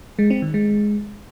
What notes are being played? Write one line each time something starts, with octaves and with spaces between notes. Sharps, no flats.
G#3
C4
D#3
G#3